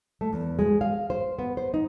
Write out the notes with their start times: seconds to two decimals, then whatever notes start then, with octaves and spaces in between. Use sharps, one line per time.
0.21 A3
0.33 E2
0.59 G#3
0.81 F5
1.10 C5
1.39 B3
1.57 C5
1.74 D#4